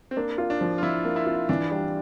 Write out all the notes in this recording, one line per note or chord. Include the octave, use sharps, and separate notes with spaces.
C4
A#3 D4
F4
D4
F3
F4
F3 E4
A#3
E4
F4
E3 D4
G3 D4